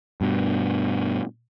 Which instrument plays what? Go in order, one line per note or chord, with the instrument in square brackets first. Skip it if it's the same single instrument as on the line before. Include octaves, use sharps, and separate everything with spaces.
[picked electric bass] G2 B2